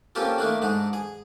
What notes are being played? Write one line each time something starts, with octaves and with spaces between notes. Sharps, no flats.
A#3 C4 C#4 F4 G4 A4
A3 A#3 D4 D#4
G#2 D4 D#4
G#4